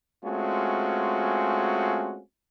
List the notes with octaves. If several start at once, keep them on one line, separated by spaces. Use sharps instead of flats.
G#3 A3 C4 C#4 F4 F#4